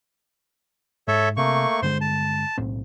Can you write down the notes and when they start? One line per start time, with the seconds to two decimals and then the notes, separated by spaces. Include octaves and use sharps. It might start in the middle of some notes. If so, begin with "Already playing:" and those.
1.08 G#2 A4 C#5 E5
1.37 C3 A3 A#3 C#6
1.82 G2 D3 G#3 C5 C6
2.01 A5
2.58 B1 A2 C4